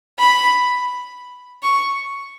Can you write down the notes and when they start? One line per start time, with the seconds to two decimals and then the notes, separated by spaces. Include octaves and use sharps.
0.19 B5
1.63 C#6